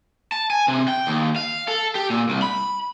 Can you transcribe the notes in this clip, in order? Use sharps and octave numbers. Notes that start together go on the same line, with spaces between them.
A5
G#5
C3
G5
D#2
F5
A4
G4
A#2
C2
B5